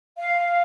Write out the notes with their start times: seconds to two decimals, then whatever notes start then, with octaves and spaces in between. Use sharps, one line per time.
0.17 F5